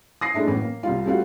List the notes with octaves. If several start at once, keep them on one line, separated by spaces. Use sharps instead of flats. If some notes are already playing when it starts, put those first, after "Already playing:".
D#6 A#6 C7
G#3 A3 D4 E4
F#2 A2 E3 B3
A#3
C2 G3 F4
G3 A3 C4 F4 F#4